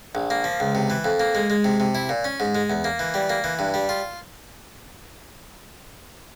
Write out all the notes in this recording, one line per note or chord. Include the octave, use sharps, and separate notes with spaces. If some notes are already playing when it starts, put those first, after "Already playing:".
A#1
A#3
F3
C#2
C3
E3
F2
A#3
G#3
G#3
C3
C3
E4
A#2
C#4
G#2
G#3
E2
A#3
E3
G3
A#3
E3
G2
G3
F4